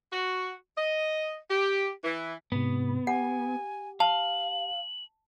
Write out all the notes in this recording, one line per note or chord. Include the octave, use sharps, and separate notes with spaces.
F#4
D#5
G4
E3
G#2 C3 B3
G4 F#5 G#5
F5 A5 F#7